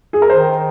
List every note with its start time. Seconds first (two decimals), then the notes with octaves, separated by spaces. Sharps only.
0.13 G#4
0.22 A#4
0.29 D#3 C5